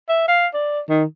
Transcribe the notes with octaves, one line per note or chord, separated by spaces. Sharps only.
E5
F5
D5
D#3